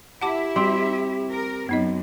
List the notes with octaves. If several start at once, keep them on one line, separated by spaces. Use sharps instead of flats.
E4 G4 E5 F#5 A5 D6
G3 C4 F#4
A#4
F#2 B3 D#4 D#5